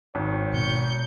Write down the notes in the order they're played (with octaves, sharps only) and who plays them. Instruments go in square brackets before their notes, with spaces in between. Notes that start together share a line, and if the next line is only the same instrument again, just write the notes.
[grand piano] G#1 [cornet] C#5
[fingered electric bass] B2 [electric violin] G6 C#7